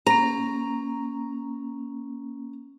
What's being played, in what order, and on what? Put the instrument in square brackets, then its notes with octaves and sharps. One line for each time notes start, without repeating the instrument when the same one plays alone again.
[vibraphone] A#3 C#4 [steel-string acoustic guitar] A#5